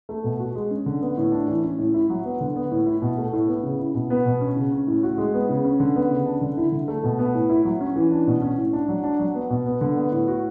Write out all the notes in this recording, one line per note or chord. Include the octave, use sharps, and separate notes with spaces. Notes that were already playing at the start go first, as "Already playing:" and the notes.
A3
B2
F#4
G#3
C#4
D3
B3
A2
D4
E3
C#4
A2
E4
F#3
B3
D3
B3
A2
E4
B2
A3
A2
B3
C#3
E4
B2
B3
B2
C#4
C#3
C#4
A2
F#4
G#3
B3
C#3
C#4
D3
B3
C#3
D4
D3
E4
D3
A3
B2
B3
A2
E4
F#3
C#4
E3
D4
B2
C#4
A2
D4
F#3
D4
F#3
B3
B2
B3
D3
B3
A2
F#4